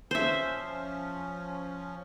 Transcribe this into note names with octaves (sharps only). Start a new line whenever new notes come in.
F3 C#4 C5 E5